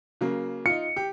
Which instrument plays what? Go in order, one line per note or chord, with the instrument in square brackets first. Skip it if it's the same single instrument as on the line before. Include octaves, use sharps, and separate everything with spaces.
[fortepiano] C#3 F#3 A#3
[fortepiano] D#4 F4 [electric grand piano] C#7
[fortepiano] G4